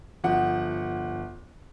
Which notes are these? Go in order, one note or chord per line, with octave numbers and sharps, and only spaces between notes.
G1 F3 F#5